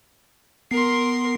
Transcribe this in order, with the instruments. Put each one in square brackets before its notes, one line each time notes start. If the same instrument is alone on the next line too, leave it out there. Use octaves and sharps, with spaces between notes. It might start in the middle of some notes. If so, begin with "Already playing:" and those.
[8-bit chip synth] B3 C7 [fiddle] A#4 C6